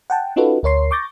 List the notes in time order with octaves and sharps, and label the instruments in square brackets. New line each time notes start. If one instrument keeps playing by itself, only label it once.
[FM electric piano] F#5 G5 A5
C#4 D#4 F4 F#4 A4 B4
D2 A#4 C#5 C6 C7
C#6 D6 G6 A6 A#6